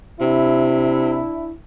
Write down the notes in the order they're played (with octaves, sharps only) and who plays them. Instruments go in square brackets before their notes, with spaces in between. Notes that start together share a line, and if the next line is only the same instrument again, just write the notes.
[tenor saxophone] C3 [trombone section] D4 E4